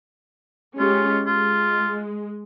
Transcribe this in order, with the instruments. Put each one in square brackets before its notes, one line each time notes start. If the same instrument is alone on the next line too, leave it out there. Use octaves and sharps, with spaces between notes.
[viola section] G#3 C#4 G4 [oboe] F4
[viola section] G#3 [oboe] F4